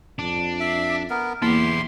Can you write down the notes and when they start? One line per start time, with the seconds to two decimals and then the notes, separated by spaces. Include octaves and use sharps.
0.19 F2 D4
0.60 E5
1.10 B3 A#4
1.42 E2 A#3 E4 G4 C6